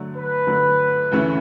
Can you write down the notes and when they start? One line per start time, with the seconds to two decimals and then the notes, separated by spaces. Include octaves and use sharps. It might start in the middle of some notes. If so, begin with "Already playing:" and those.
Already playing: D3 F#3 A3
0.15 B4
0.47 D3 F#3 A3
1.12 D2 C#3 E3 A3 C#4